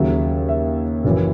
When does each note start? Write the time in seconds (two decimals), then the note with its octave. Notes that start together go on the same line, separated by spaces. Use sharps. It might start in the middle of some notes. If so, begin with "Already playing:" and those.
Already playing: D#2 C#3 F#3 E5
0.49 E5
1.04 F#1 F#2 E3